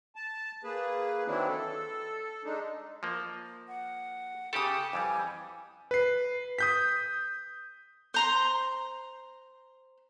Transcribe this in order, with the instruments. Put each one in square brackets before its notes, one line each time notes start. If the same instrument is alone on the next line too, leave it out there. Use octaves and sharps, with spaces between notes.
[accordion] A5
A#3 G#4 B4
D#3 E3 F#3 C4 D4 E4
A4
G#3 D4 D#4
[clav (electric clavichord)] F3 A#3
[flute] F#5
[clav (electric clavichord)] C#3 G4 A4 [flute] G5 [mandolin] D6 D#6
[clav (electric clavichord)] F2 E3 G3 [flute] G#5
[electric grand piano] B4 C7
D#6 G6 B6
[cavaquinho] C5 A#5 C6